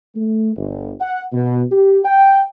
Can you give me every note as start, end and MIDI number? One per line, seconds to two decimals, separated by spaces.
0.16 0.50 57
0.56 0.92 31
1.00 1.24 78
1.33 1.64 47
1.71 2.01 67
2.05 2.44 79